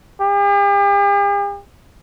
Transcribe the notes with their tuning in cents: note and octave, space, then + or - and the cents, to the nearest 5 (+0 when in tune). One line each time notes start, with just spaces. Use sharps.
G4 +45